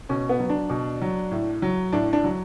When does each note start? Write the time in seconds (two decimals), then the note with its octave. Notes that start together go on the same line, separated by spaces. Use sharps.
0.09 B2 C#4
0.29 B3
0.40 F#3
0.49 D4
0.70 B2
1.01 F#3
1.31 A2
1.62 F#3
1.92 A2 D4
2.13 D4
2.24 F#3